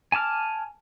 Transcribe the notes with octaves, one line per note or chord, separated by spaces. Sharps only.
G#5 A5 D6 F6